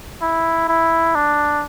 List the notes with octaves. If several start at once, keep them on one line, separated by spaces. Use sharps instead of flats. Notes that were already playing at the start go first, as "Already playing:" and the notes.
E4
E4
D4